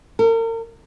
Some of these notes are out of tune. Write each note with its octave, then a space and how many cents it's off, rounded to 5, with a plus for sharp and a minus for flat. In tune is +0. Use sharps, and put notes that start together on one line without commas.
A#4 -40